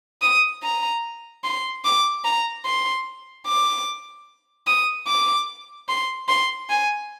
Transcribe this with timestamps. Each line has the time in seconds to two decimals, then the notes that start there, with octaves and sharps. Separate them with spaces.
0.22 D#6
0.63 A#5
1.44 C6
1.85 D6
2.24 A#5
2.65 C6
3.46 D6
4.67 D#6
5.08 D6
5.89 C6
6.29 C6
6.70 G#5